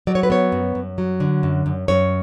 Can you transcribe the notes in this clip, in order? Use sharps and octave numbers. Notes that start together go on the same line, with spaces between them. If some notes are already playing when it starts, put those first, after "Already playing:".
F#3 D5
C#5
B4
B3 C#5
F#2
F#2
F#3
D3
F#2
F#2
F#2 C#5